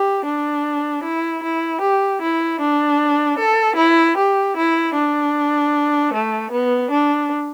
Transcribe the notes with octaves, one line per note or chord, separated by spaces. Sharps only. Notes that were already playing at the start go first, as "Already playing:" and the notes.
Already playing: G4
D4
E4
E4
G4
E4
D4
A4
E4
G4
E4
D4
A3
B3
D4